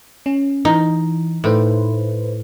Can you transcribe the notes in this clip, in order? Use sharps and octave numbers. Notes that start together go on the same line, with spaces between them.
C#4
E3 D#4
A2 D#4 B4 C5